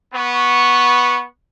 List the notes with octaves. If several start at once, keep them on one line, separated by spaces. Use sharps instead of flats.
B3 C#6